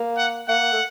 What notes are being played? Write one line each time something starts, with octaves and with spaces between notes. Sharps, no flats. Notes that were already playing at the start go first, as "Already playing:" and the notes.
Already playing: A#3
F#5
A#3 F#5
A3